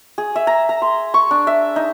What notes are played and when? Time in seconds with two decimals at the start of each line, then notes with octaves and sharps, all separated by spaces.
0.18 G#4
0.36 E5
0.47 A#5
0.69 A#5
0.82 C6
1.14 C#6
1.31 D4
1.47 E5
1.76 D#4